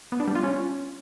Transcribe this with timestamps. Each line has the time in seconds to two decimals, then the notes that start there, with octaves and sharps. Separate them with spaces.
0.12 B3
0.20 D4
0.28 G3
0.35 F4
0.43 C#4